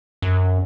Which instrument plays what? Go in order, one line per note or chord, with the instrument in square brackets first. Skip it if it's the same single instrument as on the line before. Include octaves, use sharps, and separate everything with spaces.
[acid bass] F#2